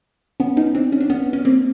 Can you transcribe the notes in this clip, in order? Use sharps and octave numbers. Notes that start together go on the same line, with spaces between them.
B3 C#4
C#4 D#4
C4 D4
C#4
D4
B3 C#4
C#4
A#3 C4